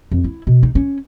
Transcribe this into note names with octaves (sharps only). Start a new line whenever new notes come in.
F2
E4
B2
D#4
C#4